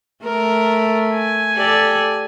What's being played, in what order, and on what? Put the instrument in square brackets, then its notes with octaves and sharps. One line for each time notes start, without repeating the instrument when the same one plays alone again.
[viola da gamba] A3 [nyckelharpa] A#4
[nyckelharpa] G#5
[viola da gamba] G4 A4 D5